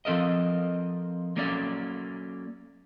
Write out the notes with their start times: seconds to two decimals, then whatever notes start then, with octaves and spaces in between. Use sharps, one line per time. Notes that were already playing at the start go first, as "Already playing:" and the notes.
0.05 F3 C4 A4 A#4 D#5
1.36 F#3 A#3 C#4 A4 D5